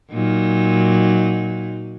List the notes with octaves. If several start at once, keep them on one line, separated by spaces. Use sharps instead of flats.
A#2 F#3 D#4